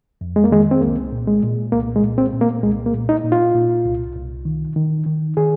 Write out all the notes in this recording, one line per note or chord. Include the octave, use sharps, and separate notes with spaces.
F2
G#3
A#3
D#3 G#3
C4
C2 A#3
A#2
G#3
A#2
C2 A#3
G#3
A#2
C4
A#2
A#3
C2 G#3
A#3
A#2
D#4
A#2
F4
A#2
C2
C2
D#3
D#3
D#3
D#3 G#4